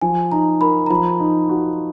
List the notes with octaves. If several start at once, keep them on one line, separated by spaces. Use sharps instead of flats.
F3 G#5
D#4 A#5
A#4 B5
A#5
F3 B5
D#4
F#4